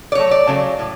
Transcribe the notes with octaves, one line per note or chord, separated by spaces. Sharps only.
D5
B2 F#3 A3 C#5
D5
C#3 F#3 A3
A2